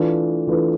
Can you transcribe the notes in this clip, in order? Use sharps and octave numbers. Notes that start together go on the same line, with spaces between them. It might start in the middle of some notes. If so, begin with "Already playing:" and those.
Already playing: E3 A3 D4 F4 B4
E3 A3 D4 F4 B4